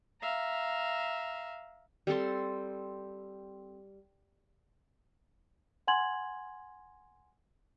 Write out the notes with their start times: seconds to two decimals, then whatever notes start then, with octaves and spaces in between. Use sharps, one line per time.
0.21 E5 F5 A#5
2.07 G3 C4 A4 C6
5.87 F#5 G#5 C6 G#6 F#7